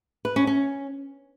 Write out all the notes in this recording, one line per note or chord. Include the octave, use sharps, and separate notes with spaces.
B4
C#4
C#4